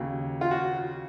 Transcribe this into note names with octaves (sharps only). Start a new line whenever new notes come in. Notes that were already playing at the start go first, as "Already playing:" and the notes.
Already playing: D#2 C#3 F#3
F4
F#4